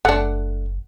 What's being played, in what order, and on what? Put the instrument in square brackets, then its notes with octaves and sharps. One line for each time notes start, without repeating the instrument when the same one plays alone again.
[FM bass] F#1 [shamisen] A3 D4 [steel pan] F#5